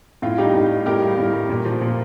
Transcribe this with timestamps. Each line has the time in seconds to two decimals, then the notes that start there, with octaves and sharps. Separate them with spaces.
0.22 A2 F4
0.38 G3 D#4 G4
0.54 A2
0.70 G3
0.86 A2 G4 A#4
1.02 G3
1.18 A2
1.33 G3
1.49 A#2
1.65 F3
1.81 A#2